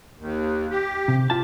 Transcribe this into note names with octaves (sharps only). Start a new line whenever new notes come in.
D#2
G4
C3
F4 A5